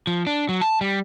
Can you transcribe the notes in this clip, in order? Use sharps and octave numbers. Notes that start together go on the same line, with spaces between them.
F3
D4
F#3
A5
G3